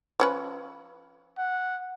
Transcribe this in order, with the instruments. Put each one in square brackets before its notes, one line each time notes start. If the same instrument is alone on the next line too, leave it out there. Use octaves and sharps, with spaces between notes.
[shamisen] F3 C#4 B4
[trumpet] F#5